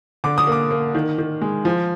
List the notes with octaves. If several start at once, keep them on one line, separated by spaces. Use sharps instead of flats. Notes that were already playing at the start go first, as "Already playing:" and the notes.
D3 D6
D#6
A#3 D6
A#3
D#3
D#3
G#3
F3